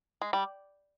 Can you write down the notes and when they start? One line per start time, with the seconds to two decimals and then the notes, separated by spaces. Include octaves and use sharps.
0.21 G#3
0.33 G3